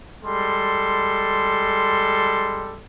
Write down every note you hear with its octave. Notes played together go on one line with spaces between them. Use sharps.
G3 G#3 A4 C6